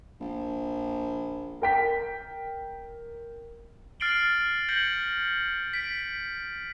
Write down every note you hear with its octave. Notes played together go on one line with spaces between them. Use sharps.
A#1
A#4 G5 B6
F6 A6 C7 D7 F#7 G7
G6 A#6 C#7 F#7
B6 D7